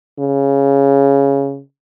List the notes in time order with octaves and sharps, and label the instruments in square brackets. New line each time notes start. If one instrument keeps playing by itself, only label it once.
[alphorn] C#3